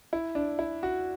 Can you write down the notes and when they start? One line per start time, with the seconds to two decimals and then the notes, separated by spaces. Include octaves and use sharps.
0.13 E4
0.35 D4
0.59 E4
0.83 F#4